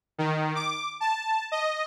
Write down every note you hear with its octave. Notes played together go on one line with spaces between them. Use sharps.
D#3
D6
A5
D#5